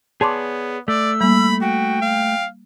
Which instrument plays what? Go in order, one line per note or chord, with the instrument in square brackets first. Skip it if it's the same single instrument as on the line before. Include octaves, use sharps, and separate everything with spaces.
[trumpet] B3 [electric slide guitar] G#4 C#5 D5 [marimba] A5 C6 D6
[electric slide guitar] A3 [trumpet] D5 [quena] E6
[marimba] G3 A#3 [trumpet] B5
[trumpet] F#4 [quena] G5
[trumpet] F5